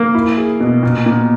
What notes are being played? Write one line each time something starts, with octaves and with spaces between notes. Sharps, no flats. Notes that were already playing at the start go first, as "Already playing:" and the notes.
Already playing: A#3
E4
G#4
B2
A#2
A#2